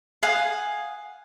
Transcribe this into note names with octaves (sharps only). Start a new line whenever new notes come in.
F5 F#5 G#5 D#6